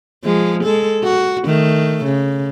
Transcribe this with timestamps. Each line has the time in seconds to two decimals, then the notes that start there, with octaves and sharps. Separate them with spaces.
0.23 F3 G#3
0.64 G#3 A4
1.03 F#4
1.46 D#3 A3
2.05 C#3